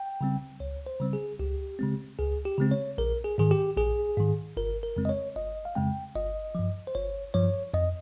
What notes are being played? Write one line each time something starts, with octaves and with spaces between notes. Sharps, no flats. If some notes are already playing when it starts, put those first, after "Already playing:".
Already playing: G5
C#3 G3 C4
C#2 C#5
C5
C#3 G3 C4
G#4
C#2 G4
C#3 G#3 C4
C#2 G#4
G4
C#3 G#3 C4
C#5
A#1 A#4
G#4
G#2 D#3 G#4
G4
A#1 G#4
G#2 D#3
G1 A#4
A#4
F2 C#3 G#3 C4
D#5
C#5
G1 D#5
F5
F2 C#3 G#3 C4 G5
G1 D#5
G2 F3
C5
G1 C#5
G2 F3 C#5
F2 D#5